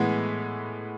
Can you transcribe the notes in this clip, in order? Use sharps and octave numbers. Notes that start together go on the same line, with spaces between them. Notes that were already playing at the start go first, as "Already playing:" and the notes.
Already playing: A2 E3 G#3 B3